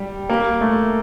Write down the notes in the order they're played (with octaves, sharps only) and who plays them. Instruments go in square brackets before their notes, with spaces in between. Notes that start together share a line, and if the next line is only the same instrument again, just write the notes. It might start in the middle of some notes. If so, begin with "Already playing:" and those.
Already playing: [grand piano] G3
A#3
A3